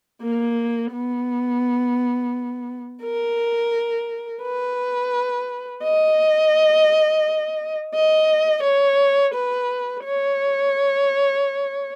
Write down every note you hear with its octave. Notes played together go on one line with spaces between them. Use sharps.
A#3
B3
A#4
B4
D#5
D#5
C#5
B4
C#5